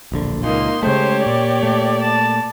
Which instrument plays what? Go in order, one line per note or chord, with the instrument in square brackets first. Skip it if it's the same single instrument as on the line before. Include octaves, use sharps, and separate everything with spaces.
[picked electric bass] D1 A#1 D3
[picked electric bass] C#2 A#2 [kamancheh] A#3 D#4 [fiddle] C6
[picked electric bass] C#3 G#3 A3 [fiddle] G4 C#5 [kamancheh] C5
[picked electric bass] A#2 [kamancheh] D5
[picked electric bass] A#2 A3
[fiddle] A5